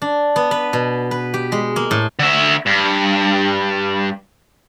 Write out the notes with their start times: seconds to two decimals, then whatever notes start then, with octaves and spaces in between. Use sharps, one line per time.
0.02 D4
0.36 B3
0.51 B4
0.73 B2
1.11 B4
1.34 G4
1.52 G#3
1.76 A#3
1.91 A2
2.19 D3 E5
2.66 G2